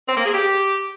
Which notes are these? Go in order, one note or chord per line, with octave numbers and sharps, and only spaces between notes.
C4
A#3
G#4
G4